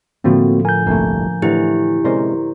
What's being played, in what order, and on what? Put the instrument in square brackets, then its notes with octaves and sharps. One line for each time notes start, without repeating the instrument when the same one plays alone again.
[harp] A2 D3 F3 [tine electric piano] A#3 C4 F#4
[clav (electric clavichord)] A#4 [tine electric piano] G#5 G6
[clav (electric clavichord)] G1 C2 A3 [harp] A#3
[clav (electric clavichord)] A2 D3 E3 [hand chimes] E4 G4
[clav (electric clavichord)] C3 G#3 C#4 [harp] A#4 C5 D5